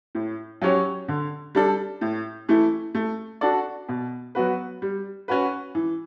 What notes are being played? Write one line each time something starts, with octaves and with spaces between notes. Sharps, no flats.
A2
F#3 C#4 G4 C#5
D3
G3 D4 A4
A2
E3 A3 E4
A3
D4 F#4 A4 D5
B2
F#3 B3 F#4 B4
G3
C#4 F#4 B4
E3